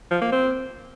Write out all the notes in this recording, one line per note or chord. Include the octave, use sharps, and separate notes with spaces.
F3
A#3
C4